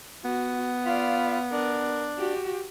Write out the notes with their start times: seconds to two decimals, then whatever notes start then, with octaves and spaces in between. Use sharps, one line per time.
0.25 B3 F#4
0.85 F4 D5 F5 B5
1.52 D4 A#4
2.18 F#4 G4